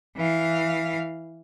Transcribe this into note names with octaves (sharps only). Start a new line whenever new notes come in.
E3 F5